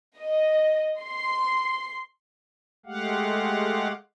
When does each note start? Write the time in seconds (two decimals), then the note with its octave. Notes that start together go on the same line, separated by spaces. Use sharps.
0.18 D#5
1.01 C6
2.86 G#3 A3 G4 F5 F#5